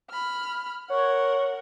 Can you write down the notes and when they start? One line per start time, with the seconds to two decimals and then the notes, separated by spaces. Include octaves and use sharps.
0.10 B5 F6
0.90 A#4 C#5 F#5